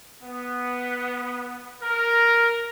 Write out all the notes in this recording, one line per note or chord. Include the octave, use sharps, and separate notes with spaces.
B3
A#4